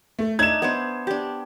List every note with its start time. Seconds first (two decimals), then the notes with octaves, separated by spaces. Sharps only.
0.19 A3
0.39 D4 D#4 E5 G#6 E7
0.62 B3 D4 C5
1.07 D4 G4